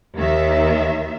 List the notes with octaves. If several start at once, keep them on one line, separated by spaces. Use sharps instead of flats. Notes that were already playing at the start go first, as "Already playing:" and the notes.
D#2 D#3 E5